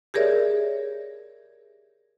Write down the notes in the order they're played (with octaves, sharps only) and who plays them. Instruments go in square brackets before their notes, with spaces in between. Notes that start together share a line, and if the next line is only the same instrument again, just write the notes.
[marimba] G4 G#4 A#4 C#5 D5 E5